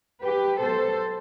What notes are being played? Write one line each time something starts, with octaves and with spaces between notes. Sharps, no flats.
G4 B4
B2 F#3 A4 C5